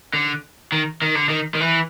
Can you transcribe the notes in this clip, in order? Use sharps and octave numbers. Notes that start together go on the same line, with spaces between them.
D3
D#3
D#3
D3
D#3
D#3
E3